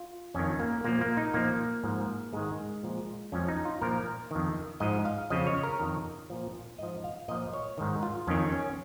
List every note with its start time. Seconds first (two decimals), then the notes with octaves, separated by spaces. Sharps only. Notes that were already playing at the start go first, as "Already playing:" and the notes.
Already playing: F4
0.34 F2 D#3 C#4
0.60 A#3
0.84 A#2 F3 A#3
1.01 A#3
1.17 D#4
1.34 A#2 F3 A#3
1.84 G#2 F3
2.33 G#2 D#3 G#3
2.83 A#2 F3
3.32 F2 F3 C#4
3.48 D#4
3.65 F4
3.82 A#2 F3 A#4
4.31 F2 D#3
4.80 G#2 F3 D#5
5.05 F5
5.30 F2 C#3 F3 D#5
5.47 C#5
5.63 A#4
5.80 F2 D#3
6.30 A#2 F3
6.78 G#2 F3 D#5
7.04 F5
7.28 A#2 F3 D#5
7.53 C#5
7.78 G#2 D#3
8.03 F4
8.27 F2 D#3 C#4
8.52 C#4